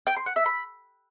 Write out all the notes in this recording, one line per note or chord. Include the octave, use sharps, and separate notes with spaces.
G5
C6
F#5
E5
B5